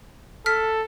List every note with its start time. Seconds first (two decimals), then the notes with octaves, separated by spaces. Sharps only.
0.46 A4 F6 B6